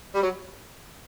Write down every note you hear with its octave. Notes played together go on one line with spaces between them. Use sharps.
G3
F#3